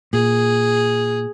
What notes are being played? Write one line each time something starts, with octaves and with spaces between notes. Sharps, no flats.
A#2 G#4